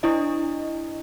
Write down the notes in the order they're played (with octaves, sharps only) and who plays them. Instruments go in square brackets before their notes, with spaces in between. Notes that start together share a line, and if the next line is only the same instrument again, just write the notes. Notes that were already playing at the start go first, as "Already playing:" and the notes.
[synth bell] D4 E4 D#5